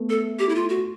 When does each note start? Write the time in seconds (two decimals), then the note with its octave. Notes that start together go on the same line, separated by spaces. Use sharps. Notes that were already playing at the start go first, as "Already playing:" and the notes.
Already playing: A3 B3
0.10 A4
0.39 G4
0.49 E4
0.55 F4
0.69 F#4